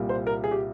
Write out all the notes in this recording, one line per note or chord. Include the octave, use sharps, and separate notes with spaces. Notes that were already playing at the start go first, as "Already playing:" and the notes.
Already playing: C2 A#2 G3
C5
A#4
G#4
G4